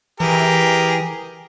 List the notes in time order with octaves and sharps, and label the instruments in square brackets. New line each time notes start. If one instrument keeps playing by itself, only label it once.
[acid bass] E3 [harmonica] G4 G#4 A#4